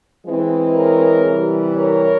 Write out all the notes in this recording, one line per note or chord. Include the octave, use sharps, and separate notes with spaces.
E3 G#3 C4
A#4 C#5
C3 E3 G3
A#4 C#5